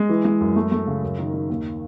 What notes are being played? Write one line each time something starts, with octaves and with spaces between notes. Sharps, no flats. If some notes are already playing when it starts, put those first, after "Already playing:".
Already playing: G#3
E3
G#3
F#2
A3
A3
C#3
F#2
D#3
D#3
D#2